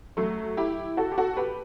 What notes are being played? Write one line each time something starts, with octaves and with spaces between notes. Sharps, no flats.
F#3 A3
E4 G4
F#4 A4
G4
F#4 A4
G4 B4